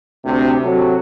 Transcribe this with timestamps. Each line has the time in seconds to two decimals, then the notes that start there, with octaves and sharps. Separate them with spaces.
0.25 D2 C3
0.63 C3 F#3 F#4 A4